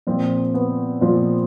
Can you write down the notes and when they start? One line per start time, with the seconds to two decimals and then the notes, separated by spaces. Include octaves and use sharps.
0.07 A#2 F3 C4
0.54 B3
1.01 A#2 F3